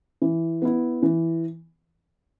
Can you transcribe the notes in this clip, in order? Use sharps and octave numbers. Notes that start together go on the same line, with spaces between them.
E3
B3 E4
E3